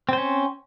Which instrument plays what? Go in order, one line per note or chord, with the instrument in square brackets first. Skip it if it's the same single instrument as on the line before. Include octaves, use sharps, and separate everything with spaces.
[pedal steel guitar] C4
C5
C#4